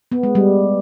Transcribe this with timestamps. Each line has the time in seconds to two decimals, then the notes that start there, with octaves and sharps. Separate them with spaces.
0.12 B3
0.23 G#3
0.35 G3